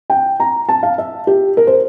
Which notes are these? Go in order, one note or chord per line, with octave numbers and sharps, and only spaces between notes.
G5
A#5
A5
F5
E5
G4
A#4
C5